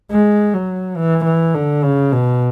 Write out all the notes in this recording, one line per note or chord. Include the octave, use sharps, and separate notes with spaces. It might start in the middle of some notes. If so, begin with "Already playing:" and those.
G#3
F#3
E3
E3
D3
C#3
B2